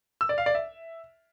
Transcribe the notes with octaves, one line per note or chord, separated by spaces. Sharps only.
E6
D5
F5
D5
E5